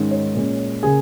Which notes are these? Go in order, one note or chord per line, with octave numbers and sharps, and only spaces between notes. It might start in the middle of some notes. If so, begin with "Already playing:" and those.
Already playing: G#2 D#3 C#4
C#5
A#2 G#3 C#4
C#3 A#3 G#4 G#5